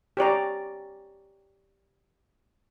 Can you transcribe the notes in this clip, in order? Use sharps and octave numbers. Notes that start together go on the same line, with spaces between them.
G4 C#5 D5 A#5